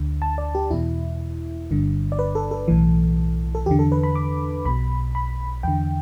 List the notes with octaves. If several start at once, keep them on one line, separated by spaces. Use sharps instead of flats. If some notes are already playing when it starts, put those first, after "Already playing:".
Already playing: D2 D3
A5
D5
G4
E2 B2 E4
G1 G2 D3
D5
B4
A4
A4
B1 A2 E3
A4
E2 D3 G4
A4
B4
B5
D6
B1 B2 B5
B5
E2 D3 G5